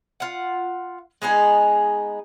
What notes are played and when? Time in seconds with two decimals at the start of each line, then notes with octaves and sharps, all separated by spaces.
0.20 F4 F#5
1.22 G#3 B3 D#4 G#4